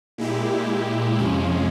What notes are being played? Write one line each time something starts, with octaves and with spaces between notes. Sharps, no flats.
A#2 G#3 E4 G4
F2 C3 F3 G#3 C#4